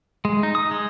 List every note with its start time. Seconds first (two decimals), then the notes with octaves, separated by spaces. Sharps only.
0.25 G#3
0.43 D#4
0.55 D#6
0.71 G#3